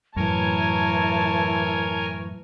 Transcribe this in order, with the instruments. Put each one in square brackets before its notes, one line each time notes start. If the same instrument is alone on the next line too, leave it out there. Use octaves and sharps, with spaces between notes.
[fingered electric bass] F#2 A2 [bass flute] E3 [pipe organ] A#4 C#5 G#5 [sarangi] A5